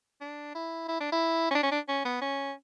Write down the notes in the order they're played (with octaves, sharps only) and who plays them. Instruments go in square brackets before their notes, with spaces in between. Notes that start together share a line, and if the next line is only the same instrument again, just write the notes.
[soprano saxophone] D4
E4
E4
D4
E4
C#4
D4
C#4
D4
C#4
B3
C#4